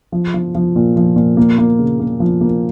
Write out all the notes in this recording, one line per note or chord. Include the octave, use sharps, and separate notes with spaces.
F3
F3
F3
A#2
F3
A#2
A#3
A#3
C#3
A#3
F3
A#3